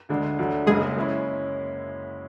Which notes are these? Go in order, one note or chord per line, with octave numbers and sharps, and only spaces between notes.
D2 D3 G#3 D4
D2 D3 F#3
F#1 F#2 C#3 G#3 G#4
G#3 C#4 E4